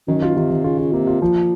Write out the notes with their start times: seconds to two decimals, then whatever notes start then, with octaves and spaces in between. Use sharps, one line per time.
0.08 F#2 D#3
0.22 F4
0.36 C3 D#3
0.50 D#3
0.64 C#3 F4
0.78 F4
0.93 C3 A#3
1.07 F4
1.22 A#2 F3